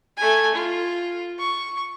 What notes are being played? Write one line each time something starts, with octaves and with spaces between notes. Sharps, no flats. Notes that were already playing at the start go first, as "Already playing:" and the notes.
A3 G#5
F4
C#6